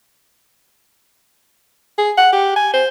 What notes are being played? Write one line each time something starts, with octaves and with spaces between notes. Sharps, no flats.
G#4
F#5
G4
G#5
C5